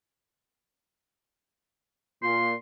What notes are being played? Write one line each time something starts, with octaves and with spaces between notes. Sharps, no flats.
A#2 C6